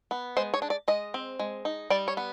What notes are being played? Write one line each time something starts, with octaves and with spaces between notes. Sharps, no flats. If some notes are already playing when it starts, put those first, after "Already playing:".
B3
G#3 C5
C#5
D4
D5
G#3 D#5
C4
G#3
D#4
G3 D5
C#5
B3